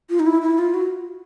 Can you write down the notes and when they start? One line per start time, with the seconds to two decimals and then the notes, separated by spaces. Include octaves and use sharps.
0.10 F4
0.20 D#4
0.26 E4
0.42 E4
0.58 F4
0.74 F#4